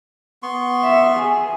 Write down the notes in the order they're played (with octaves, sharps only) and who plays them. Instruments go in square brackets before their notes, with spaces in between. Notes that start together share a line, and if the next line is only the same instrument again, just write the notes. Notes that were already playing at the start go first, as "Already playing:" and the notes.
[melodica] B3 C6 C#6
[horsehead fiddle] E5
G#4